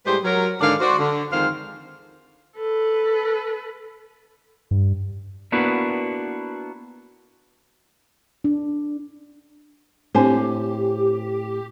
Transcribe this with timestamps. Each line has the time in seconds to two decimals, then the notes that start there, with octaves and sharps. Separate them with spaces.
0.06 A2 G3 G#3 G4 B4 C5
0.24 F#3 A#4
0.61 G#2 D3 D#3 A#4 D5 F5
0.80 F#4 C5 D5
1.00 D3
1.32 F2 D#3 G#3 C5 F5
2.56 A4 B4
4.71 G2
5.52 A#3 B3 D4 E4 F#4 B4
8.44 D4
10.15 A2 C4 D4 G4 C5 G#5